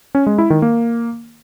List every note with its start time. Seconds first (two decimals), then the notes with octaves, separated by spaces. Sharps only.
0.15 C#4
0.27 G#3
0.38 E4
0.50 D#3
0.62 A#3